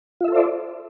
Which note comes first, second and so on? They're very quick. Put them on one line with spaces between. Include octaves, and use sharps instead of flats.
F4 E5 A4 C5 D5